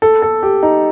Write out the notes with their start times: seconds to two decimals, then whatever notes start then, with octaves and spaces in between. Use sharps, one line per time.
0.02 A4
0.22 A4
0.43 G4
0.63 D#4